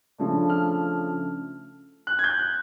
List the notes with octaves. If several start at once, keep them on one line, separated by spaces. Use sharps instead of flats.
C#3 F3 A3 D4
F6
F#6
G#6
G6
F#6